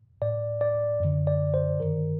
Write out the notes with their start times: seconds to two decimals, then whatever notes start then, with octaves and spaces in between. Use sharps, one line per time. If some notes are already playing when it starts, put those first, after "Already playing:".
0.22 A2 D5
0.61 D5
1.00 F#2 D3
1.27 D5
1.54 C5
1.79 G2 D#3 A#4